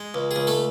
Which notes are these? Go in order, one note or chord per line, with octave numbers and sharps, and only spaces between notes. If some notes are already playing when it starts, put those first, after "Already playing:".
Already playing: G#3
C#2
G#4
C#2
A3 A4